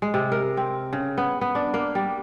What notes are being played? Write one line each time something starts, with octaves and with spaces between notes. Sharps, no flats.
G#3
C3
A#4
C4
C#3
B3
B3
D4
A#3
G3